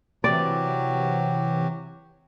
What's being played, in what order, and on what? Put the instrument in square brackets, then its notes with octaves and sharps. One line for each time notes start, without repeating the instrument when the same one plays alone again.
[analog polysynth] C3 E3 [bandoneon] F#3 F#4 G4 [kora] D5